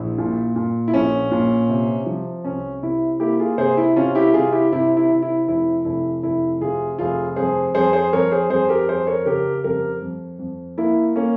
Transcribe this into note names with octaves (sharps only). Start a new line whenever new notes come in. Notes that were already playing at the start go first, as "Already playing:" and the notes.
Already playing: A#1 E4
A#2
A#2
E4
A#1 C#4
A#2
C3
F3
C2 C#4
C3 E4
A#3 E4 G4
F4 G#4
C3 G#4 C5
E4
C3 C#4 F4
E4 G4
C3 F4 G#4
E4 G4
C3 E4
E4
C3
E4
F1 E4
F1 E4
F1 E4
C3 F4 G#4
F1 F4 G#4
F2 G#4 C5
F2 G#4 C5
G#4 C5
F2 A#4 C#5
G#4 C5
F2 G#4 C5
G4 A#4
F2 G#4 C5
A#4 C#5
C#3 G4 A#4
F2 G4 A#4
F2
F2
A#3 E4
A#3 C#4